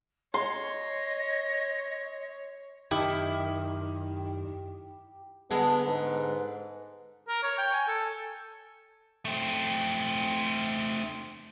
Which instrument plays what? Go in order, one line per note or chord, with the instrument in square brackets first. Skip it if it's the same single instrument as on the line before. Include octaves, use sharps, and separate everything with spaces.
[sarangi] C#5 [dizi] D#5 [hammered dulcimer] C6
[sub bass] F#2 [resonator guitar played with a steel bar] D#3 [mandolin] E4 [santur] G4
[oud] D3 G#3 [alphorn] B3 [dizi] A5
[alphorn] G#2 [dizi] B4
[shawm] A#4
C#5
G5
G#5
A4
[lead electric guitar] A3 C4